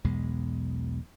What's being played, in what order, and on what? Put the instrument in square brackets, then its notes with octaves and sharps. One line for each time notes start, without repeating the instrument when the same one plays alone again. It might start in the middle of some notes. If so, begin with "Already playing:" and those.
[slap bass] B1 E2 B2 G#3